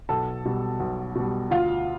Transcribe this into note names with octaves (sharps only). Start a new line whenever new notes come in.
B1 A4 A5
B2 G3
B1
B2 G3
D2 F4 F5